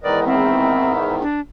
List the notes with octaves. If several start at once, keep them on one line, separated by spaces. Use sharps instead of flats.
E2 G#2 D#3 A#4 B4 D5 D#5
C4 E4 A#4 E5
D4